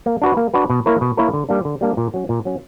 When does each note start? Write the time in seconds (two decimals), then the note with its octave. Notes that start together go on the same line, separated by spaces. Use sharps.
0.06 A#3
0.22 D4 F#4 B4
0.37 A#3
0.54 D4 F#4 B4
0.70 B2
0.86 A#3 E4 A#4 C#5
1.01 B2
1.17 A#3 E4 A#4 C#5
1.33 D3
1.49 G3 A#3 D4
1.65 D3
1.81 G3 A#3 D4
1.97 A#2
2.14 F#3 C#4
2.29 A#2
2.45 F#3 C#4